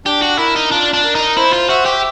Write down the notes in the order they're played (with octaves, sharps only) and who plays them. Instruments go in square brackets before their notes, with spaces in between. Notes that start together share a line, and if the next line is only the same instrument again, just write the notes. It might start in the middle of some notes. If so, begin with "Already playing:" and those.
[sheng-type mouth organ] D4 [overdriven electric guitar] G4
[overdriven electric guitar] F#4
[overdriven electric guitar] E4 [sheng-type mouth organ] A#4
[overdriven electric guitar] D#4
[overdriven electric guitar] D4 [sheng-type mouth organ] F4
[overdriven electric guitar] D4
[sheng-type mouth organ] A#4
[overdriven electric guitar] D#4
[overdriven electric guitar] E4 [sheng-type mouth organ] C5
[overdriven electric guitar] F4
[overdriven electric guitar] F#4 [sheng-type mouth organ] E5
[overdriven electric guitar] G4